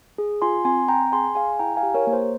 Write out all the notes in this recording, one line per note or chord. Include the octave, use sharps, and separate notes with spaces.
G#4
F4 G#5 C6
C4 G#5 C6
C4 G5 A#5
G#4 G#5 C6
G#4 F5 G#5
E4 G5 A#5
F5 G#5
G4
A#4 C#5
A#3
C5